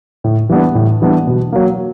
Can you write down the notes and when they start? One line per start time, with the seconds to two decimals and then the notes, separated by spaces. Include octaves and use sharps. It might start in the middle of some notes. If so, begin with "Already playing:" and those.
0.24 A2
0.49 E3 G3 B3 D4
0.75 A2
1.02 E3 G3 B3 D4
1.27 B2
1.52 F#3 A#3